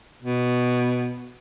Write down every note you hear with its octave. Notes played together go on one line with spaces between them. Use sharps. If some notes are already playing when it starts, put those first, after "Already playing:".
B2